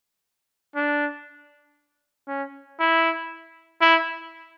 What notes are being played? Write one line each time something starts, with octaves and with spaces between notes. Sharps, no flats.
D4
C#4
E4
E4